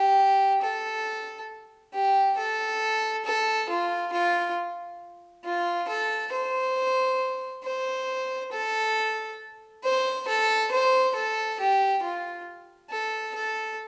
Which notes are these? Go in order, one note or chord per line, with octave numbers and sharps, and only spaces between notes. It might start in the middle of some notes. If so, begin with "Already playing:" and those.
Already playing: G4
A4
G4
A4
A4
F4
F4
F4
A4
C5
C5
A4
C5
A4
C5
A4
G4
F4
A4
A4